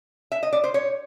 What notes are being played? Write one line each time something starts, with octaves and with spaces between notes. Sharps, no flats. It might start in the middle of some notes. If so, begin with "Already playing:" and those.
E5
D#5
D5
C5
C#5